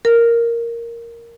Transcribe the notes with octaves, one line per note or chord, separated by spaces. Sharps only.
A#4